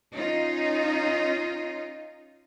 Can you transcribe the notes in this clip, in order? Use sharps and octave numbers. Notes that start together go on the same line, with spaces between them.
C#4 D#4 F4